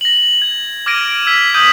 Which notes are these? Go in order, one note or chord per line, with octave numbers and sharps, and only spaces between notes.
A#6 F#7
G#6
D6 F6 G#6 A#6 D7 D#7
E6 G#6 B6 G7
D#6 E6 G6 D#7 F#7